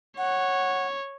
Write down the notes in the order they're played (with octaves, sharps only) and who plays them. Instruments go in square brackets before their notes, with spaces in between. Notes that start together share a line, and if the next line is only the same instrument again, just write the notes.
[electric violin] C#5 [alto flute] F#5